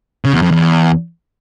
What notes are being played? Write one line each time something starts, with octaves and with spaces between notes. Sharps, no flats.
C#3
E2
F2
E2